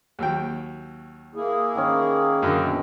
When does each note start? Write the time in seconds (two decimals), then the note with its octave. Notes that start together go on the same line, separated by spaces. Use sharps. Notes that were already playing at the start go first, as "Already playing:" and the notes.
0.19 D#2 F#3 G5
1.35 A#3 E4 G#4
1.75 D#3 C#4
2.43 F#2 D3
2.58 B2